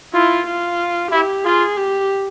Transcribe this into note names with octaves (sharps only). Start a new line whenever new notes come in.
E4 F4
F4
E4 G4
F4 G#4
G4